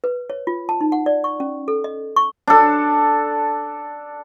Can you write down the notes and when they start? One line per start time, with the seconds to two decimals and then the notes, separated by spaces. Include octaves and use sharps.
0.04 B4
0.30 C#5
0.47 F4
0.69 A5
0.81 D#4
0.92 F#5
1.06 D5
1.24 C#6
1.40 C#4
1.68 A4
1.84 D#5
2.16 C#6
2.47 D4 A4